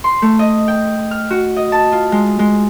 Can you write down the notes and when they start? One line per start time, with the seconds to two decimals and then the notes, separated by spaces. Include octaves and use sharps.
0.04 C6
0.22 A3
0.39 D#5
0.68 G5
1.11 F6
1.30 F#4
1.56 D#5
1.72 A5
1.92 F4
2.12 G#3
2.39 G#3